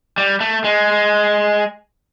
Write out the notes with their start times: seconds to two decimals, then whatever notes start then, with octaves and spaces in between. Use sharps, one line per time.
0.18 G3
0.41 A3
0.64 G#3